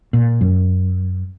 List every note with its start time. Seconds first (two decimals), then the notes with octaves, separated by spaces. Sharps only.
0.13 A#2
0.41 F#2